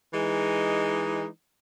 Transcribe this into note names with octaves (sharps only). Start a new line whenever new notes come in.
E3 G#3 D#4